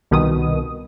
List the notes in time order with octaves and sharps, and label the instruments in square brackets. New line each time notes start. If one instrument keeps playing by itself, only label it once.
[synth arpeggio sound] C2 B2 D#3 D#6